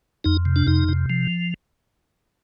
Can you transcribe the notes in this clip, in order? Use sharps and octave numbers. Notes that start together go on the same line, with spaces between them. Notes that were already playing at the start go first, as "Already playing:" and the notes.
F2 D#4
C3
D4
F2 D#4
C3
F3